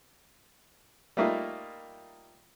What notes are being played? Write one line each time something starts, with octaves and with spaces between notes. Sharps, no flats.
G3 A3 A#3 D#4 F4